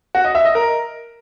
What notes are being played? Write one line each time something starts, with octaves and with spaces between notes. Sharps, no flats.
F#4
D#5
E5
D#5
A#4